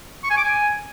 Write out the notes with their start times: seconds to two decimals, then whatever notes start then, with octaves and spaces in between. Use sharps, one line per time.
0.23 C#6
0.30 G#5
0.37 D6
0.44 G#5